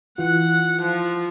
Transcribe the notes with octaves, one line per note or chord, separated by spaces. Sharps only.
E3 F4 F#5
F3